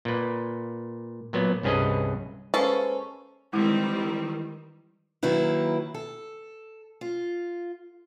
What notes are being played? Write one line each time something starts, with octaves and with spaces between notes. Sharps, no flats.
A#2 B4
A#2 F#3 B3
C2 G2 C#4 G#4 B4 D#5
G#3 A#3 C#4 A4 B4 C5
D#3 E3 G3 G#3 C4 E4
D#3 F#3 A#3 E4 B4
A4
F4